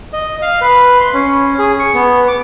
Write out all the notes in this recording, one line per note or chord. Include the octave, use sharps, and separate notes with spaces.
D#5
F5
B4
C6
C#4
G#4
C#6
B3
D6